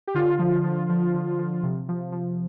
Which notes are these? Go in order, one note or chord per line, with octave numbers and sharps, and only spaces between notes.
G4
D3 F4
F3
F3
F3
D3
F3
C3
F3
F3